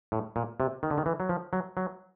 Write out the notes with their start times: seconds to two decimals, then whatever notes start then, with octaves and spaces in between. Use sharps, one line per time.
0.12 A2
0.36 A#2
0.60 C3
0.83 D#3
0.91 D3
0.98 D#3
1.06 E3
1.20 F#3
1.29 F3
1.53 F#3
1.77 F#3